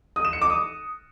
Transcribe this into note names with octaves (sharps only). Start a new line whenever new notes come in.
D#6
E7
C#7
D6
D#6